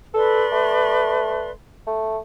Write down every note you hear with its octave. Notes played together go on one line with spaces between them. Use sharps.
A4 B4 D5 C6
A3
A3